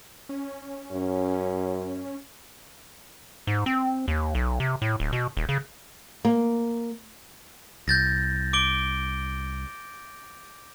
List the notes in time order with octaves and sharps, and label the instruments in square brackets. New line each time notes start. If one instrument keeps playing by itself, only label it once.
[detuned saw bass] C#4
[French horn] F#2
[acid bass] G#2
C4
D#2
B1
C3
A2
D1
B2
D#1
C#3
[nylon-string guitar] A#3
[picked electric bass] C2 [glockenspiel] G6 A6 A#6
[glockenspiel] D6 D7 G7